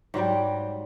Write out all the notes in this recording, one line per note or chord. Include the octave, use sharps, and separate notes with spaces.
G#2 F#3 G3 G5